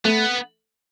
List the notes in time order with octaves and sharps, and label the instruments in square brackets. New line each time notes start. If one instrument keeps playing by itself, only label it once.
[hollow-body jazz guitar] A3 [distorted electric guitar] B3